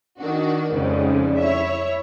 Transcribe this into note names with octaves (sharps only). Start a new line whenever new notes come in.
D#3 D4 F#4
F2 G#2 C#3 G3
E4 C#5 E5